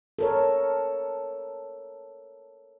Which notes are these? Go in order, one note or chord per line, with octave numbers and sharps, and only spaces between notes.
A4 A#4 C#5